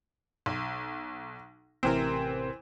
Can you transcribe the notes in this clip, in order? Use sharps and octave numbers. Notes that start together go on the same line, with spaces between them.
B1
A1 C3 E3 C4 A#4